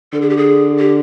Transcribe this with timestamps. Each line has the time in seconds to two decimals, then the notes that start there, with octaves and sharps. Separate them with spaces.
0.13 D3 A4
0.22 G#4
0.29 G4
0.37 G#4
0.79 G4